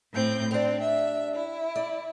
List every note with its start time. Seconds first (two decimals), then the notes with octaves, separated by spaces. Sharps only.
0.12 A2 C4 G6
0.51 C4 D4 G4
0.81 E5
1.35 E4
1.76 D5